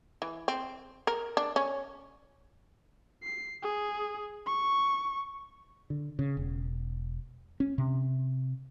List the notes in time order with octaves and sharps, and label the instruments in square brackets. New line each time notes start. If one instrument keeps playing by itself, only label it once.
[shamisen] E3
C4
A#4
D4
C#4
[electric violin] C7
G#4
C#6
[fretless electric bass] D3
C#3
E1
C#4
C3